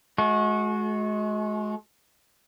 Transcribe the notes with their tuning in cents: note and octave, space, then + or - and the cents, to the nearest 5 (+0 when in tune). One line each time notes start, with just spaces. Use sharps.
G#3 +35 F#4 -20